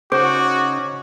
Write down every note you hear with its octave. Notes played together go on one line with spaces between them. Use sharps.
C#3 C#4 D#4 F#4 C5 D6